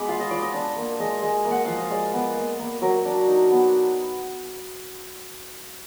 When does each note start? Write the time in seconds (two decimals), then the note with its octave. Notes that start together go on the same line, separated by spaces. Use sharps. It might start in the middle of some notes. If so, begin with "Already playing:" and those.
Already playing: G#3 B3 B5 D6
0.08 F4 F5
0.20 D#5
0.31 F4 D5
0.42 D#5
0.54 D4
0.76 A#3
0.99 G#3 D#5
1.22 G#3
1.45 A#3
1.51 F#5
1.65 F3 F5
1.78 D#5
1.90 G#3 D5
2.13 B3
2.36 A#3
2.59 A#3
2.82 F#3 A#4
3.05 D4
3.27 D#4
3.51 B3